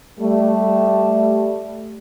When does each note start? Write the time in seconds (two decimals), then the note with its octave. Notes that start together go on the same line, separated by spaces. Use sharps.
0.19 G3 A3